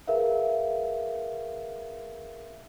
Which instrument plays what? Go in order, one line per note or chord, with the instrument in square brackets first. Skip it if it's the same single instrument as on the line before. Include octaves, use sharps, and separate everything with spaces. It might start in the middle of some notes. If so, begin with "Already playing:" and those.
[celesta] G#4 A#4 B4 E5 F5